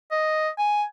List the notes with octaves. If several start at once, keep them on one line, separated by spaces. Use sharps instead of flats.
D#5
G#5